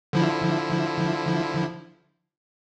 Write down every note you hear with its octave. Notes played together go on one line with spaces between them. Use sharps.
D3 F3 E4